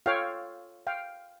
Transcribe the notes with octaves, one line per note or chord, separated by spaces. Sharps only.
F4 A4 C#5 F5 G5
F5 G5